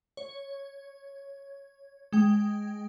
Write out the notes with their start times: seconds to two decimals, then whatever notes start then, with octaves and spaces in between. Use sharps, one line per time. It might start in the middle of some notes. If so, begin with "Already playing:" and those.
0.17 C#5
2.13 G#3 G5